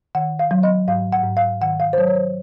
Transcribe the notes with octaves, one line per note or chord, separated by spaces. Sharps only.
D#3 F#5
F5
F#3
D#5
G#2 F5
F#5
G#2
F5
D#3 F#5
F5
C5
F#3 C#5
C#5
C5